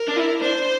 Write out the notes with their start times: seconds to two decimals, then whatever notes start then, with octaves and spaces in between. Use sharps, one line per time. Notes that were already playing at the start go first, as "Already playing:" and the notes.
Already playing: A#4
0.09 D4
0.17 E4
0.42 D4 C5